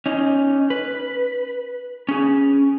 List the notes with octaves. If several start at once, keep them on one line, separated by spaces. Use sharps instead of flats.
C#4 D#4
B4
C#4 G#4